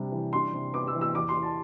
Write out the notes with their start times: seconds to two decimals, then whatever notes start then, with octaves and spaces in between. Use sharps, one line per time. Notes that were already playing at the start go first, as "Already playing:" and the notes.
Already playing: C3 G3 D4
0.12 E3
0.33 D4 C6
0.53 C3
0.73 B3 D6
0.87 E6
0.95 E3
1.01 E6
1.15 E2 D6
1.29 C6
1.35 E2
1.43 A5